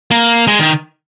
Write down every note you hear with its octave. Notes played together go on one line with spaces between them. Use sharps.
A#3
G#3
D#3